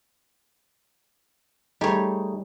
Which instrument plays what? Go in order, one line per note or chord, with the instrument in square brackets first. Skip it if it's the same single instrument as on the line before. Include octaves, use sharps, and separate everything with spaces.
[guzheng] G3 C#5 [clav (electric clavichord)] A3 D#4 G#4